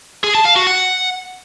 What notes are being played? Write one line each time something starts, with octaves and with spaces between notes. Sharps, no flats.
G#4
A5
F5
F#4
F#5